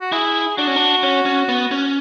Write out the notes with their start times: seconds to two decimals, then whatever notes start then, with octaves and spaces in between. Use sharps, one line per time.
0.01 F#4
0.12 E4 G#4
0.57 D4 F#4
0.67 C#4
0.76 D4
1.03 C#4
1.26 C#4
1.49 B3
1.71 C#4